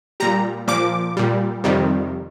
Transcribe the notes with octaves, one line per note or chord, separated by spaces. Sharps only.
A#2 G3 A#5
A#2 F3 D6
A#2 G3
F2 C3 D#3 G3